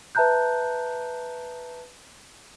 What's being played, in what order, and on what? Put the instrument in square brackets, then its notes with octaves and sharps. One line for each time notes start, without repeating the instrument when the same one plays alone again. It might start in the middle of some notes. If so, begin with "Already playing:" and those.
[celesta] B4 E5 A5 A#5 F#6 G6